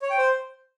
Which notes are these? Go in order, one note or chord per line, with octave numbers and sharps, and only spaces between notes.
C#5
G5
C5